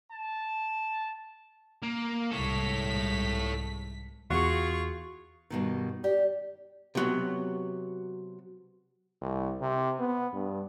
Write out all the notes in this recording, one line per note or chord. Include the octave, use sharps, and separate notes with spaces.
A5
A#3
C2 G#2 A4 C#5 B6
E2 F4 F#4 G#4 C#6
G2 B2 D#3
G4 D5
C3 F#3 B3
C2
C3
B3
G2